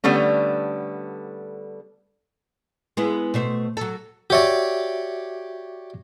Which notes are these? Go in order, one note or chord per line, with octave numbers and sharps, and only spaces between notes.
D3 G3 A3 B3 C#4
G#3 B3 E4
B2 A3 C5
F#3 A4
F#4 G4 C#5 D5 E5